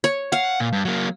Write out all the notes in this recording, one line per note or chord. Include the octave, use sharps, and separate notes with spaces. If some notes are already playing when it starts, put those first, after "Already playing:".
C#5
F5 F#5
A#2
G2
F#3 A#3